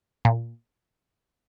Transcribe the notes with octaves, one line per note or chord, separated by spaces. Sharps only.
A#2